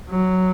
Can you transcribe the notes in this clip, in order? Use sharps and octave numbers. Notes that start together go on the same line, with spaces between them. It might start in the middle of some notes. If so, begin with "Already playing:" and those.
F#3